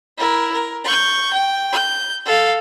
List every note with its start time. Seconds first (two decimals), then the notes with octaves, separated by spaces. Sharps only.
0.18 E4 A#4
0.53 A#4
0.84 C#6 G6
1.33 G5
1.73 G6
2.25 A4 F5